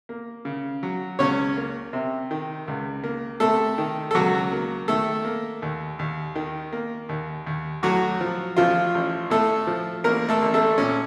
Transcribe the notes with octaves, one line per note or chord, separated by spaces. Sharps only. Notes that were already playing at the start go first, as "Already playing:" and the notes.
A#3
C#3
F#3
C#2 C#4 C#5
A#3
C3
D#3
C#2
A#3
C3 A3 A4
D#3
A4
C#2 F#3 F#4
A#3
D#3 A3 A4
A#3
D#2
D#2
D#3
A#3
D#2
D#2
A2 F#3 F#4
F3
A1 F3 F4
A1
A2 A3 A4
F3
A1 A#3 A#4
A3 A4
A1
A3 A4
A#2 C#4